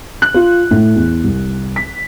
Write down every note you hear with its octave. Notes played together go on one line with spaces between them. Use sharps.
F#6
F4
A2
E2
C2
B6